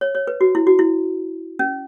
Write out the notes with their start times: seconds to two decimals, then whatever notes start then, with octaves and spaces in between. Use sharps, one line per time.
0.01 C#5
0.15 C#5
0.27 B4
0.41 F#4
0.55 E4
0.67 F#4
0.79 E4
1.59 C#4